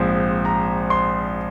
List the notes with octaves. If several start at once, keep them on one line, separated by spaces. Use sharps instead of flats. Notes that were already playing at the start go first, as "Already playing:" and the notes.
Already playing: A#1 G#2 F3 C4
A#5
C6